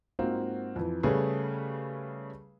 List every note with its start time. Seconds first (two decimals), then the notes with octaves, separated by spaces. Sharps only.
0.19 G#2 A#3 C4 F4 F#4
0.76 F2 E3
1.03 C#3 G3 A3 C#4 G#4 B4